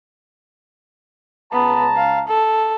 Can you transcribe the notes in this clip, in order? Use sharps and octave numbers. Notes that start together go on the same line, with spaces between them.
C#2 B3 A5 A#5
F5
A4